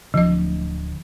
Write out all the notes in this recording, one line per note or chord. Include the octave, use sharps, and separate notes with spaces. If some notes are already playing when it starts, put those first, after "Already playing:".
D1 D3 F3 D#5